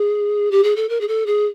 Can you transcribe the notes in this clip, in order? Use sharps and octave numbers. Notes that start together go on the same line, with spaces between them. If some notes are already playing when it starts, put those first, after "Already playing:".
Already playing: G#4
G4
G#4
A4
A#4
G#4
A4
G#4